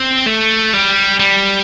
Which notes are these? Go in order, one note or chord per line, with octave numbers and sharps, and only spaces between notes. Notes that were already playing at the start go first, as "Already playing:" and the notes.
Already playing: C4
A3
G3
G3